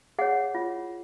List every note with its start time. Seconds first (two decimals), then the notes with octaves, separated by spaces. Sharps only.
0.19 G#4 C#5 F#5
0.55 F4